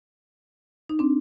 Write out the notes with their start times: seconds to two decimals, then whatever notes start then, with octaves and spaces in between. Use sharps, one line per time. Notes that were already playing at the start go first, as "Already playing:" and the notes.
0.89 D#4
0.99 C4 D4